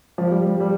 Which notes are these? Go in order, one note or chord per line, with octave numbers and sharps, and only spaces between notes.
F3
G3
G3
G3